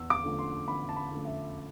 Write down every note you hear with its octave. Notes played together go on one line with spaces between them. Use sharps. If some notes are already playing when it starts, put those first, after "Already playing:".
Already playing: E2 E6
D6
D3 F3 A3
C6
E2 B5
A5
B5
D3 F3 A3
E5